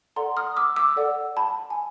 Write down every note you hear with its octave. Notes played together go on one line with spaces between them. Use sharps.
A4 D5 F#5 A#5 C6
D#6 F6
D6 E6
D6 E6
A4 D5 F#5
A5 B5
G#5